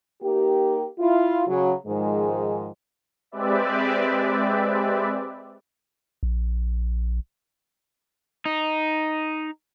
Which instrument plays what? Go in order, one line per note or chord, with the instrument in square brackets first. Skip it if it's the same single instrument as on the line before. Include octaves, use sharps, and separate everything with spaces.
[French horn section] A#3 D#4 G4
E4 F4
C#3 F#3
G#2 D#3 F3 G#3
[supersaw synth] G#3 C4 G4 B4 D5 E5
[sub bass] A#1
[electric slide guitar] D#4